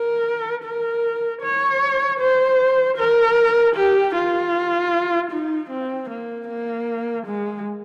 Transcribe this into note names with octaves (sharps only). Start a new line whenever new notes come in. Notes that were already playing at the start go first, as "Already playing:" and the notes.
Already playing: A#4
A#4
C#5
C5
A#4
G4
F4
D#4
C4
A#3
A#3
G#3